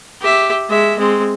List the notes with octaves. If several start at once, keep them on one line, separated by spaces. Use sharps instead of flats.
G4 E5
G#3 E5
G#3 C4